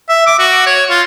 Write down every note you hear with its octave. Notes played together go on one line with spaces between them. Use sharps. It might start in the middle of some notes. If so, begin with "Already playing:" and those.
E5
D6
F#4
C#5
F4